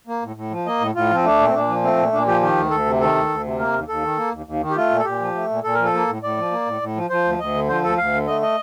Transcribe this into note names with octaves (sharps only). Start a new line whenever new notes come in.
A#3
A2
A2
F3
A#3 D#5
A2
A2 F4
F3 C4
A3 D4
A#2
C4
A#2 D4
F3
A3 C4
A#2
A#2 D4
F3 G4
D#3 G4
D2
D2 A4
C3
D#3 A4
D2
D2
C3
A#3 A#4
D#2
D#2 A4
D#3
A#3
D#2
D#2
D#3
G4
A3 F4
A#2
A4
A#2 G4
F3
A3
A#2
A#2 A4
F3 A#4
A4
A#3
A2
A2 D5
F3
A#3
A2
A2
F3
F3 C5
D2
D2 D#5
D3
F3 C5
D2 A4
D2 F5
D3
A3 D#5
D#5